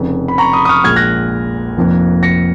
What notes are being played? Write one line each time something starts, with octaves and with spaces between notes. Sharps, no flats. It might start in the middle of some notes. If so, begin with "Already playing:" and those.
Already playing: F1 F2 C#3
B5
A#5 C#6
B5 D#6
D#6
C#6 F6
A#1 A#2 G#3 F6 G#6
F#6 A#6
F1 F2 F3 A#3
A#6 C#7